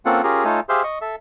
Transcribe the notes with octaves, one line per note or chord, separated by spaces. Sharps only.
A#3 C4 C#4 F4 A4 F#5
C#4 F4 G4 G#4 A#4
A3 D#4 F4 A4 C#5 G#5
G4 G#4 C5 E5 F5 C6
D#5 C#6
A4 E5